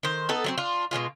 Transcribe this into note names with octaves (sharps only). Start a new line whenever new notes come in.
D#3 C5
B3 D#4 A4
F#3 B3 C4
D4 F4
B2 F3 G#3 F4